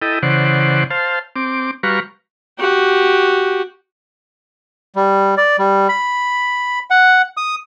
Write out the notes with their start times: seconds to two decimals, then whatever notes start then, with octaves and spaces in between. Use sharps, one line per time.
0.02 E4 A4 D#5 G5
0.23 C#3 E3 C5 D5 F#5
0.90 C5 F5 A5
1.36 C4 D6
1.83 G3 F#4 B4 F5 A#5 C#6
2.59 F#4 G4
4.96 G3
5.38 D5
5.59 G3
5.89 B5
6.91 F#5
7.37 D#6